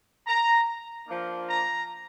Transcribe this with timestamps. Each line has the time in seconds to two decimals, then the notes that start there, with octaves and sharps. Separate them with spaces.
0.27 A#5
1.07 F3 A#3 D4
1.48 A#5